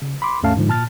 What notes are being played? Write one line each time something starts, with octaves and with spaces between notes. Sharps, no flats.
C#3
B5 C6 D6
D#2 G#2 A3 C#4 F5 A5
G#2 D3 F3
A#2 A5 F6 A6